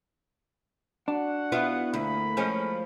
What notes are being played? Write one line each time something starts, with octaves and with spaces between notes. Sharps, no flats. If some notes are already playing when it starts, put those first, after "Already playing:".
D4 F#4 F#5
B3 E4 F4
D2 A#3 B5
F3 G#3 C#4